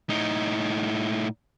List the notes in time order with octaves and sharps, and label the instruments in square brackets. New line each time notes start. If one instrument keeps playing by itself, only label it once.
[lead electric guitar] A2 D#4